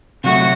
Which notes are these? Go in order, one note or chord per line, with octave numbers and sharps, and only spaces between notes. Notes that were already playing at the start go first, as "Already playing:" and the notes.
C3 F#3 A3 F#4